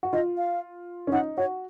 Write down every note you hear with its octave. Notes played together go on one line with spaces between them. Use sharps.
F#4
F4 D#5
F5
C#4
D#4 F#5
F#4 C#5